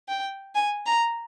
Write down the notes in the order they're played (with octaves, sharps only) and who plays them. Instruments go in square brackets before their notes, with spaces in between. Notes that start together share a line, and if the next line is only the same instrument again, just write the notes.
[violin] G5
G#5
A#5